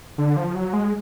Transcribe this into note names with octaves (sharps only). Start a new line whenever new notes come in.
D3
F3
F#3
G#3